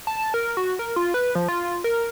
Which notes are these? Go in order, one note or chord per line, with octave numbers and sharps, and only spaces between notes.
A5
A#4
F#4
A#4
F4
B4
F3
F4
A#4